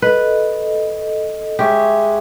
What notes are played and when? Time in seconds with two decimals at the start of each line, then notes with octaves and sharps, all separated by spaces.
0.02 A4 B4 D#5
1.59 G#3 G4 C#5 E5